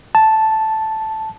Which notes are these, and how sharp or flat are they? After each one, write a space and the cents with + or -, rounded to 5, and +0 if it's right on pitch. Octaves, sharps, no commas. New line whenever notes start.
A5 -5